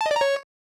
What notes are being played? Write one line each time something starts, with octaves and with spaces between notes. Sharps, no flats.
A5
D#5
D5
A#5
C#5